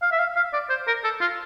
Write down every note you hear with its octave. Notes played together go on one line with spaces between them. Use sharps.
F5
E5
F5
F5
D5
C5
A#4
A4
F4